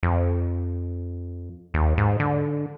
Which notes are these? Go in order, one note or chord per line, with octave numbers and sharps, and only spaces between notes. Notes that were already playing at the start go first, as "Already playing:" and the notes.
F2
D#2
G#2
D3